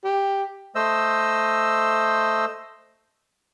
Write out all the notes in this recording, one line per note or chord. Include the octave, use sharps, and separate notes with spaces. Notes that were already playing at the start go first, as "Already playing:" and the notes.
G4
A3 C5 D#5 E6